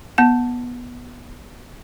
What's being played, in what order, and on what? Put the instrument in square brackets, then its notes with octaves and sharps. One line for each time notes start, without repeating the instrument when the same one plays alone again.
[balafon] B3 A5